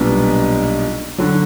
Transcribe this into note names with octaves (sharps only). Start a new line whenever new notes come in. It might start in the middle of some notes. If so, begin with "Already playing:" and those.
Already playing: B1 A#2 G3 B3 D4
D3 F#3